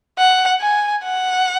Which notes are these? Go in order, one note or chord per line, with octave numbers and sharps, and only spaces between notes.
F#5
G#5
F#5